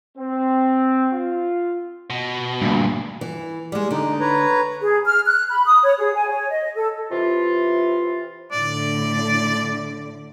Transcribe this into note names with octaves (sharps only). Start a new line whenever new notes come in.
C4
F4
B2
D2 G2 A#2
E3
G3 G#3
D3 D#4
B4 C#5 A#5
G#4
F6
F#6
B5
D#6
C#5
G#4
G#5
C#5
D#5
A4
C3 E3 F4
A2 D3 D5